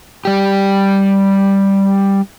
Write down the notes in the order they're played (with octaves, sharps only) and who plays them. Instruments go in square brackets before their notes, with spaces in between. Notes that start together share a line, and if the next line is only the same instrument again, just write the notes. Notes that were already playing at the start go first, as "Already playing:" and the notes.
[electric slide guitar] G3 G4